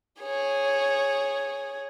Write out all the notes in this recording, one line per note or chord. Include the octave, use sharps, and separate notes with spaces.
G#4 C#5